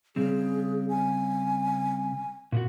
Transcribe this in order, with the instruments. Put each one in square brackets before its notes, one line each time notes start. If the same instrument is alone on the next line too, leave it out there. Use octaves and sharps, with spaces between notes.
[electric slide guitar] C#3 G3 C4 [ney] G#4
[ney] G#5
[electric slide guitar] A#2 B3 F#4